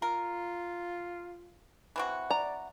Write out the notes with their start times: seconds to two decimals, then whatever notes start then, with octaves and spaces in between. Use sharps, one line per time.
0.02 F4 A#4
1.96 E3 C4 F#4
2.30 D5 A#5